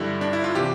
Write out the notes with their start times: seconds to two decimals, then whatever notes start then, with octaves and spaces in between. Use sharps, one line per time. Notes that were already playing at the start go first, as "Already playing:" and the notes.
Already playing: G2 D3 G3 E4
0.21 D4
0.33 E4
0.44 F4
0.55 C3 E3 G4